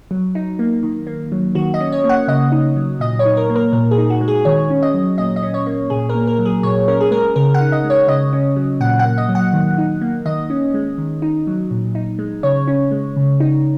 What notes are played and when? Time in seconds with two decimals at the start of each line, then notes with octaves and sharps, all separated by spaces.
0.11 F#3
0.35 D#4
0.59 A#3
0.83 D#3
1.07 A#3
1.32 F#3
1.55 D#3 F#4
1.74 D#5
1.80 C#4
1.92 C#5
2.04 A#3
2.09 F#5
2.28 C#3 D#5
2.52 D#4
2.76 F#3
3.00 A#2 D#5
3.19 C#5
3.25 D#4
3.37 A#4
3.50 A#3
3.56 A#4
3.73 A#2 A#4
3.91 G#4
3.98 D#4
4.10 F#4
4.21 G#3
4.28 G#4
4.45 D#3 C#5
4.70 C#4
4.82 D#5
4.94 F#3
5.18 A#2 D#5
5.36 D#5
5.43 C#4
5.54 C#5
5.66 A#3
5.90 A#2 G#4
6.09 A#4
6.15 A#3
6.27 A#4
6.39 F#3
6.45 G#4
6.63 A#2 C#5
6.88 C#4 A#4
7.01 G#4
7.11 G#3 A#4
7.36 C#3 A#4
7.54 F#5
7.61 D#4
7.72 D#5
7.84 G#3
7.90 C#5
8.08 C#3 D#5
8.33 C#4
8.56 F#3
8.81 A#2 F#5
8.99 A#3 F#5
9.18 D#5
9.29 F#3
9.35 F#5
9.53 D#3
9.78 D#4
10.01 A#3
10.26 D#3 D#5
10.50 C#4
10.74 G#3
10.98 D#3
11.22 D#4
11.47 F#3
11.71 A#2
11.95 D#4
12.19 G#3
12.43 C#3 C#5
12.68 C#4
12.91 G#3
13.16 C#3
13.40 D#4